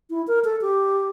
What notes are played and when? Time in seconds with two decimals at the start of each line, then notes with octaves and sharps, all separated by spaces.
0.10 E4
0.28 A#4
0.44 A4
0.62 G4